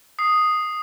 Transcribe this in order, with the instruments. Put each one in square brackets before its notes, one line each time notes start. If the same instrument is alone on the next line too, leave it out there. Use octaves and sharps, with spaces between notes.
[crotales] D#6 C7